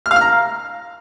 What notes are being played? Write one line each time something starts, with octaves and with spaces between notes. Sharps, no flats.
F6
F5
F6
A#5